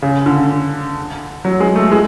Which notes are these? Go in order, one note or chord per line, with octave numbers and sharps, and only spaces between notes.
C#3
D3
F#3
G#3
A3
G#3